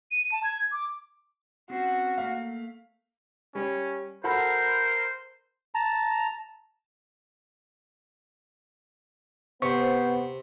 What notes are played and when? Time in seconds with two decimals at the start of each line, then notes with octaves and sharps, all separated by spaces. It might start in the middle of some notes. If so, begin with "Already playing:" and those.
0.11 D#7
0.32 A5
0.44 G#6
0.72 D6
1.70 C4 C#4 F#4 C5
2.18 A3 A#3 F5
3.55 G3 C#4
4.24 F#4 A4 A#4 C5 B5
5.75 A5 A#5
9.62 C3 B3 C5 C#6